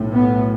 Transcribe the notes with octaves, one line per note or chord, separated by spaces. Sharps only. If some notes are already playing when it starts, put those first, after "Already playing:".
Already playing: B1 A2
B3